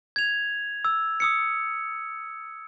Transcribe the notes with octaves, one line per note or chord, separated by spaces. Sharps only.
G#6 F7
E6
D#6 E6 C#7